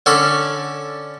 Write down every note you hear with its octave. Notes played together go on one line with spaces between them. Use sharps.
D3 C#4 A4 D5